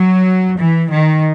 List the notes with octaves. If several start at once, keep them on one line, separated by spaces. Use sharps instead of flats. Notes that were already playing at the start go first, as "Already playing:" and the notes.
Already playing: F#3
E3
D#3